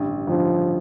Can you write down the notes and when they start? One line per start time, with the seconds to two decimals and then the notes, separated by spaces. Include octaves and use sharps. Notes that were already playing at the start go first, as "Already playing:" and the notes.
Already playing: A1 G2 D3
0.27 A1 G2 D3 F3